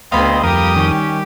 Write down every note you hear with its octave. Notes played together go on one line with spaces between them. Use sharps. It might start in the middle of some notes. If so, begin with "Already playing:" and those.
D2 B3 C4 D#5 F5 B5
F2 G3 G4 A#4 D#6
D#3 C#4